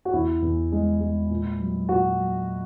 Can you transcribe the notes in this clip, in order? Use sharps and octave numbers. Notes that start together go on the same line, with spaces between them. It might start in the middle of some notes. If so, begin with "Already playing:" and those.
F#4
E2 E4
E2
G#3
G#3
A#2
F#3
A#2 F#4
F#3